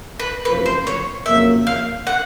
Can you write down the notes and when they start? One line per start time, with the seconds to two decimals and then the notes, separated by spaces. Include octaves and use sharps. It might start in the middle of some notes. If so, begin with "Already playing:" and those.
0.19 B4
0.45 F#1 F2 C3 F3 A3 B4
0.66 C5
0.87 C#5
1.26 F2 C#3 F#3 A#3 E5
1.67 F5
2.07 F#5